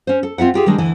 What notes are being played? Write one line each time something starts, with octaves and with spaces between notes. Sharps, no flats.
C#4 C5
A4
C4 F4 E5 F#5
F4 G4 G#4
D#3 G3 G#3 D4
D2 E3 G#5